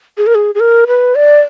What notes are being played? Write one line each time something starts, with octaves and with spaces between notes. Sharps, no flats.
G#4
A#4
G#4
G#4
A#4
B4
D5